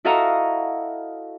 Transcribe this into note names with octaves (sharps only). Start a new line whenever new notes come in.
E4 F#4 A4 D#5 F5 A#5